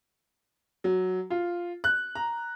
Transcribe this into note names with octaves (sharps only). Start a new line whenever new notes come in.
F#3
F4
F#6
A#5